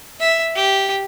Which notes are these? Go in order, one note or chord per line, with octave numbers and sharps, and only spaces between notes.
E5
G4